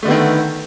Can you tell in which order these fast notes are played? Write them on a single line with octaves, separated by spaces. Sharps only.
A3 D3 B3 D#3